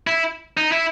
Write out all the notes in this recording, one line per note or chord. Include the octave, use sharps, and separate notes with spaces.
E4
D#4
E4